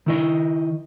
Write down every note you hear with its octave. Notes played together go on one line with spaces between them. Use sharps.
D#3 E4 D#5